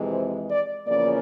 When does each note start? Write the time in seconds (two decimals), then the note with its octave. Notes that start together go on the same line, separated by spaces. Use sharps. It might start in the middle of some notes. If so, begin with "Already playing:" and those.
Already playing: F2 C3 E3 G#3
0.11 C5
0.50 D5
0.87 E2 C#3 F3 A#3 C#4 D5